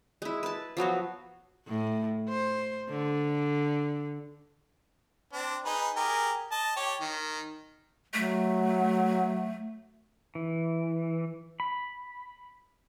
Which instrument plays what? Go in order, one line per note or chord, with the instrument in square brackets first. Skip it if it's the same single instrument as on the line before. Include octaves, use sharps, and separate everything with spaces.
[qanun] G#3 E4
B4 A5
F3 F#3 B3 F#4
[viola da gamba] A2
C5
D3
[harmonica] C4 D4
D#4 G#4 B4
G4 G#4 A#4
D#5 A5
G4 C#5
D#3
[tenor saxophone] F#3 [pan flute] A3
[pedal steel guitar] E3
B5